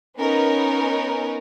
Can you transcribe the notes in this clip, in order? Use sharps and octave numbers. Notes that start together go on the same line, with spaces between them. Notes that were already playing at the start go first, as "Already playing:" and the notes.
B3 C#4 D#4 A#4 B4